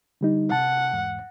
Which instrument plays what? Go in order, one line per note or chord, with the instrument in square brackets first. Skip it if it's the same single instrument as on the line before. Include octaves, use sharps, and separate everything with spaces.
[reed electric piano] D3 G3 D#4
[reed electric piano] C3 A5 [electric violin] F#5
[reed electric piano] E2 G#2